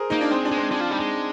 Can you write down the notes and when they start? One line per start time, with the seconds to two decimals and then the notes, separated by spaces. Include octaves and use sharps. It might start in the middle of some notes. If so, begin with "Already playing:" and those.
Already playing: G#4 A#4 C5
0.10 A#3 D#4
0.21 D4
0.31 G#3 C4
0.45 D4
0.51 G#3
0.57 C4
0.71 G#3 D4
0.81 F3
0.90 G3 D#4
1.00 G#3